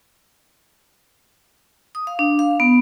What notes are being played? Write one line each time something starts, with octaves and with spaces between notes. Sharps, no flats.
D#6
F5
D4
F5
B3